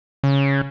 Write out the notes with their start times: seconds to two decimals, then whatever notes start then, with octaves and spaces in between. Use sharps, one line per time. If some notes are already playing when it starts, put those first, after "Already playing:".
0.24 C#3